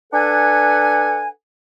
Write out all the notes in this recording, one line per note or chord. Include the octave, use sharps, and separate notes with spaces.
D4 A4 B4 F#5 G#5